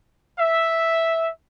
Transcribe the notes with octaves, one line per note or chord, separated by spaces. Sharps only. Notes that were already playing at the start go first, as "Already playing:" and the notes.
E5